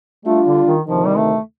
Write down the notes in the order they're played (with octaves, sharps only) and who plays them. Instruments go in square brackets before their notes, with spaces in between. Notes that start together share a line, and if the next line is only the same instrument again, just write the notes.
[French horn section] G3 D4 F4 [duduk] A3
[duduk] D3
D#3
[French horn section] D2 C3 D#3 [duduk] F3
[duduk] G3
A3